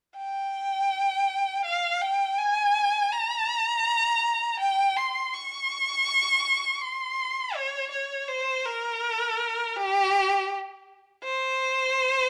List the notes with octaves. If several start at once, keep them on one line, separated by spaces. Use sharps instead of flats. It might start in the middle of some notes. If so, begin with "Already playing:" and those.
G5
F5
G5
G#5
A#5
G5
C6
C#6
C6
C#5
C#5
C5
A#4
G4
C5